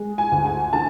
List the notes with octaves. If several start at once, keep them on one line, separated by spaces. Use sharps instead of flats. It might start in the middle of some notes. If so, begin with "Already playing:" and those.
Already playing: G#3
G#5
D2
G#5
D3 A5